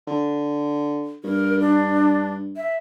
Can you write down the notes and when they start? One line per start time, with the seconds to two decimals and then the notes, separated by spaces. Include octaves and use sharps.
0.07 D3
1.24 G2 A#4
1.60 D4
2.56 E5